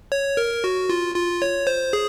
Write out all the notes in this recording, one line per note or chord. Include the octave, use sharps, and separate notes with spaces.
C#5
A#4
F#4
F4
F4
C#5
C5
G#4